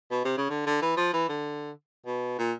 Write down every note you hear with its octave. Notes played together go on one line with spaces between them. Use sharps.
B2
C3
C#3
D3
D3
E3
F3
E3
D3
B2
A#2